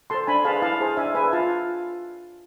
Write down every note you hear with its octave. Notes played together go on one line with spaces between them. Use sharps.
A4 C5 A5 C6
D4 G#5 B5
G#4 B4 F5 A5
E4 F5 A5
G#4 C5
D4 E5 G#5
G#4 B4 E5 G#5
F4 F5 A5